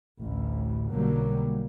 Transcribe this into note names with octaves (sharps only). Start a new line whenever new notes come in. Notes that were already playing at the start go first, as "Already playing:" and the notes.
A1 D2 A2
B1 D3 F#3 G3 A#3